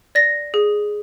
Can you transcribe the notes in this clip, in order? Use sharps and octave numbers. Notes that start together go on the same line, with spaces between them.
D5 A#6
G#4